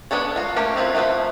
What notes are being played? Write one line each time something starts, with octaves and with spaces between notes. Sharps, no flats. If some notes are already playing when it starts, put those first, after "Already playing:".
B3 D4 A4 C#5
F4 F#4
A3 A#3 C#4 G4
F3 C4 E4 F4
F3 A3 F4 B4 E5